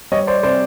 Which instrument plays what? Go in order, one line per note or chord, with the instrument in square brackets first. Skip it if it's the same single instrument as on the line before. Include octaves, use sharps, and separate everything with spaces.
[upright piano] G3 C#5 D#5
C5 D5
C3 C5 D5